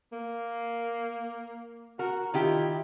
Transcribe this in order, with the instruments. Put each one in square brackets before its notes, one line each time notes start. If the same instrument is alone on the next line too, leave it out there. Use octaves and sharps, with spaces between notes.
[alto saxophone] A#3
[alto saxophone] F#4 [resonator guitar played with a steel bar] A#4
[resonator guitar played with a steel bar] D#3 E4 G4 [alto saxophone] F4